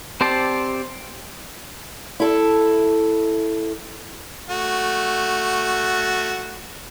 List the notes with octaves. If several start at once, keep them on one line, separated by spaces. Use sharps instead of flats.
C4 G4 C5 D5 A5
E4 A4
A3 F#4